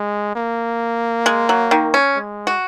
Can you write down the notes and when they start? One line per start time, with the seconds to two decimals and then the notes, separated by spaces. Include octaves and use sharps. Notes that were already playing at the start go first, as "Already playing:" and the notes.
Already playing: G#3
0.36 A#3
1.26 G#3
1.49 F#3
1.71 D#3
1.94 C#4
2.16 G#3
2.47 F#4